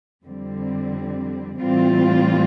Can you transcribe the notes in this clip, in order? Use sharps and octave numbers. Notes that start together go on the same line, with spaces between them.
F2 D3 G3 C4
A2 E3 G3 C4 F4